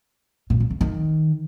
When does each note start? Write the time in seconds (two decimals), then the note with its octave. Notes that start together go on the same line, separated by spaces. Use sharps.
0.50 A#2
0.60 A#2
0.70 C#3
0.81 D#3